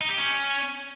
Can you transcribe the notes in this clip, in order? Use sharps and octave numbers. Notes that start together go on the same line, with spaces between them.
D#4
G4
C#4